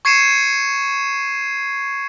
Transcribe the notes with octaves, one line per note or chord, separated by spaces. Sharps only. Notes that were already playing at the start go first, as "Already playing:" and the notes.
C#6 G#6 C7 C#7 D#7 E7